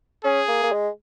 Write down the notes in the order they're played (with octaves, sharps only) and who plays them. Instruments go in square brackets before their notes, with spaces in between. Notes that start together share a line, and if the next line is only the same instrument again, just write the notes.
[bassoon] C#4 [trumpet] G#4
[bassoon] A#3
A#3
G#3